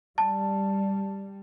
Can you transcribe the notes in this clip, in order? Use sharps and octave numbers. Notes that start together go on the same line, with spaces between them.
G3 A5